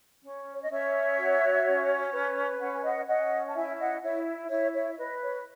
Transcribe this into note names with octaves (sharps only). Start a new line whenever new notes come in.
C#4
C#5
D#5
C#4 C#5 E5
F#4
C#4
B4
C#4 F#5
G#5
D#5 F#5
C#4 D#5 F#5
A5
E4 E5 G#5
D#5 F#5
E4 C#5 E5
E4 C#5 E5
C#5 E5
E5
B4 D#5
C#5